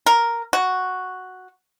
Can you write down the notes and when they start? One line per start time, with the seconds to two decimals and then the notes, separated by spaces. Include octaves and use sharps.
0.06 A#4
0.53 F#4